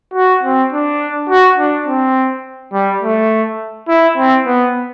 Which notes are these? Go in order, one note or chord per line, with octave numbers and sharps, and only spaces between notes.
F#4
C4
D4
F#4
D4
C4
G3
A3
E4
C4
B3